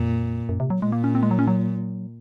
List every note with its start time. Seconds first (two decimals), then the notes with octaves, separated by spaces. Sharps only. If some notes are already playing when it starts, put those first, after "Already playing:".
Already playing: F2 A#2
0.49 F#2
0.60 C3
0.70 F#3
0.82 A#2 G#3
0.92 A#3
1.04 C#4
1.15 C4
1.23 G#3
1.31 F#3
1.39 C#4
1.48 F#3